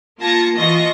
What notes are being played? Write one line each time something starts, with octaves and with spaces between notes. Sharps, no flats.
A#3 F4 A5 G#6 A#6 C#7
E3 F4 D#5 C#6 A#6